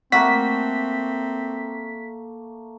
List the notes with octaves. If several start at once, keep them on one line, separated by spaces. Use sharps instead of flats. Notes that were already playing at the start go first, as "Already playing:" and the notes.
A3 A#3 C4 F#4 B6